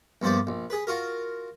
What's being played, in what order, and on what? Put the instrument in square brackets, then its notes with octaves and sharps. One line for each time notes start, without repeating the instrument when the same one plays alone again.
[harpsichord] A#1 G2 B3 C5 D5
A#1
G#4 B4
F4 F#4 A#4